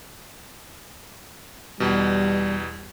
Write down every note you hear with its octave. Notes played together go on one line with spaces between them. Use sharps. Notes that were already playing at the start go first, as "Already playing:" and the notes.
E2 B2 G3